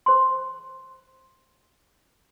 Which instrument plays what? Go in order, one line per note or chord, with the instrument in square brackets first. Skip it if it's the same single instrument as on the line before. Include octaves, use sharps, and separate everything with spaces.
[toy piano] C5 C6